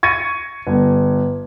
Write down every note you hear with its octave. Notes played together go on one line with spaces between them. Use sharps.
C#6 G#6 A#6 C#7 D#7
G1